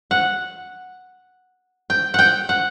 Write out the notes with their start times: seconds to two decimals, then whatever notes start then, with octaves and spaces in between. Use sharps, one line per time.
0.11 F#5
1.90 G5
2.14 F#5 G5
2.49 F#5